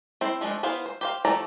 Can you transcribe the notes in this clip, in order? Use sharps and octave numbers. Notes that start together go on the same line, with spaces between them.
C4 E4 C5
F3 G#3 A3 D4
B3 E4 C5 F5
C5
G4 C5 F5
F3 A3 G4 D5 A#5